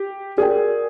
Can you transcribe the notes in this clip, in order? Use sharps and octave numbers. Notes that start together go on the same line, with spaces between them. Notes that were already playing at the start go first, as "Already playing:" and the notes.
Already playing: G4
F#4 G#4 A#4 D5 G5